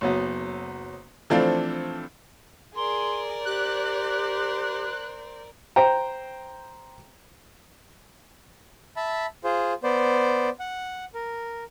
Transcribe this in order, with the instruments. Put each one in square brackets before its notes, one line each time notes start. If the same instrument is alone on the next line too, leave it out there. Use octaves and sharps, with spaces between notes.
[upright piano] F#1 F#3 B3
E3 F3 A3 C4 D4 F4
[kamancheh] G#4 [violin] A#4 D5 [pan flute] C6
[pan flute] G4 [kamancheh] C5 [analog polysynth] F#6
[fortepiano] C5 G5 A#5
[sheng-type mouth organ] E5 A5 B5
F4 G#4 C5
B3 C5 D5
F#5
A#4